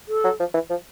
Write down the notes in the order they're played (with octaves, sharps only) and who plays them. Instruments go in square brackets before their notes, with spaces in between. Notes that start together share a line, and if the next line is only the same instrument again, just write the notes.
[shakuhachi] A4
[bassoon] F#3
F3
E3
F3